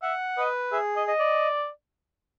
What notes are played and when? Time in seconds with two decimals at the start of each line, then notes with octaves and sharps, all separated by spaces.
0.03 E5 F#5
0.37 B4 D#5
0.72 G#4 E5
0.96 D#5
1.08 D#5
1.19 D5